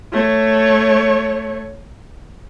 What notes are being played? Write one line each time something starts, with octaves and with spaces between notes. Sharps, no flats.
A3 C#5